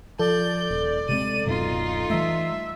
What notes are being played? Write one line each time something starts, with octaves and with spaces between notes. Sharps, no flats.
F3 A4 D5 G6
D#1
C3 G#3 C4 D#7
D1 F#2 B2 D#4 F4
E3 G3 A3 E5